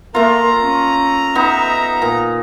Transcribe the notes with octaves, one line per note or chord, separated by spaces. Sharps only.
A3 A#3 F4 A#4 A#5
C#4
B3 D#4 E5
A#2